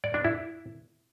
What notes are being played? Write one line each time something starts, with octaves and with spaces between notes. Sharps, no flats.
D5
D4
E4